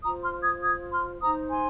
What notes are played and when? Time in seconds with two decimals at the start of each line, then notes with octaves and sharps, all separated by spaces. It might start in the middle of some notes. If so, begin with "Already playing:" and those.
0.04 F4 C5 A#5 D#6
0.23 C6 F6
0.42 D#6 G#6
0.62 D#6 G#6
0.92 C6 F6
1.21 D#4 C5 A#5 D#6
1.50 G#5 C6